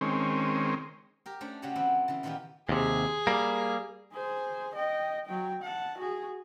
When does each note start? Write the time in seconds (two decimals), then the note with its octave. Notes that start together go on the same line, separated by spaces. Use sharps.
0.01 D#3 G#3 C4 C#4
1.26 G4 A#4
1.41 A3 C#4 D4 C5
1.62 C#3 A3 F#4 G4 C#5
1.75 E3 F#3 B3 C4 E4
2.08 C#3 E3
2.23 A#2 D#3 E3 B3 F4 G4
2.69 D#2 C3 G#4
3.27 G3 A#3
4.13 G#4 C5
4.75 D#5 G5
5.26 F#3 G5
5.62 F#5 A5
5.98 F#4 G#4